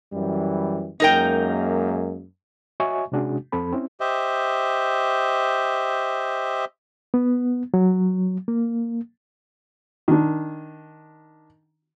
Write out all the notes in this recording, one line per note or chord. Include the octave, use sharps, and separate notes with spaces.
F#2 E3 G3
F#2 G#3 A#3 D#4 A#4 G5
F#4 C#5 D#5 E5 G#5 C#6
C3 G#3 C#4 D4 F#4 G#4
F2 F3 C4 A4 B5
C4 C#4 E4
G4 C5 D#5 E5
B3
F#3
A#3
D#3 D4